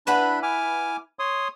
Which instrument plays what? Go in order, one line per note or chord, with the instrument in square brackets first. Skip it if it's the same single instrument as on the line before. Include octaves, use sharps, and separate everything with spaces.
[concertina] D4 B5 F#6 [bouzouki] E4 B4 F#5
[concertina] G#5 D6 F6
C#5 C6 D#6